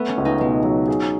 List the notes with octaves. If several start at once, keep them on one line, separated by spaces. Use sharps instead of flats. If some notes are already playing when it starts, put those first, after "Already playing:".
Already playing: A3 B3
C#4
C#2
D#4
B2 G#3
F#3
G#4